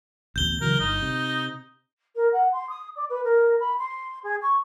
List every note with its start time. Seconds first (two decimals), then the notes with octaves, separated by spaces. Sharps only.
0.36 A1 D2 B2 G6 G7
0.61 C#3 E3 F#3 A#4
0.80 G1 D#4
1.02 C3
2.15 A#4
2.32 F#5
2.52 C6
2.69 D#6
2.95 D5
3.09 B4
3.24 A#4
3.59 B5
3.78 C6
4.23 G#4
4.42 C#6